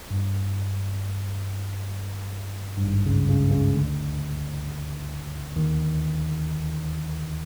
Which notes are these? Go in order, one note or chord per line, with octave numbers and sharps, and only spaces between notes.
G2
G2
G#1 G#2
C#2 C#3
C#2 C#3
C#2 C#3
D2 D3
D#2 D#3